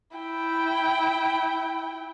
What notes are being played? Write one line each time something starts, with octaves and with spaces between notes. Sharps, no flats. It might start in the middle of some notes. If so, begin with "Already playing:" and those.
E4 G5